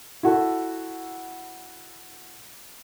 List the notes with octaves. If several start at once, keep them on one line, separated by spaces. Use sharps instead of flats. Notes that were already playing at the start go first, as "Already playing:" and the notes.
E4 F#4 A4